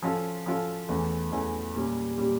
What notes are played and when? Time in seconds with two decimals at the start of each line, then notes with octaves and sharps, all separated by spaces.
0.02 F3 C#4 F4 A4
0.46 F3 C#4 F4 A4
0.89 E2 E3 A3 C#4
1.32 E2 E3 A3 C#4
1.75 A#2 G3 C#4 G4
2.18 A#2 G3 C#4 G4